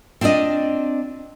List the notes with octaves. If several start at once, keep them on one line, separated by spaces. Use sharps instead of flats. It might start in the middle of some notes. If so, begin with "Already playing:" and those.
C4 D4 F4 D5 D#5